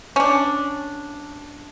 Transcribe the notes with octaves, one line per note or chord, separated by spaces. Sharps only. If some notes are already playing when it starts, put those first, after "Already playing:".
C#4 D4